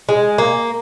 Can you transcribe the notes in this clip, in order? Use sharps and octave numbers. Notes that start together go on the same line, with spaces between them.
G#3
A#3